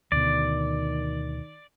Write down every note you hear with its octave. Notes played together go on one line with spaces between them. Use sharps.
D2 B2 D#3 D5